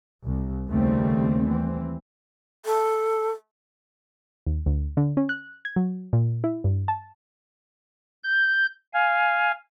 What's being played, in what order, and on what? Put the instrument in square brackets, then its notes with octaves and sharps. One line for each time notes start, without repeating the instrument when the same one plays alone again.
[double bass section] C2
D#2 C#3 G3 A3 C4
E3 C4
[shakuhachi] A4
[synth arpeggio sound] D#2
D2
D3
C#4
F#6
G#6
F#3
A#2
E4
G2
A5
[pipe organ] G6
F5 G#5